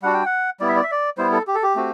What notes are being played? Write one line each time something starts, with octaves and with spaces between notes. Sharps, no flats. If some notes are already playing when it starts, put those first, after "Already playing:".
G3 D4 F#4 F#5
G5
F#5
G3 B3 E4 D5
E5
D5
E5
D5
G3 B3 E4 C5
A4
G4
A4
G4
A3 C4 F#4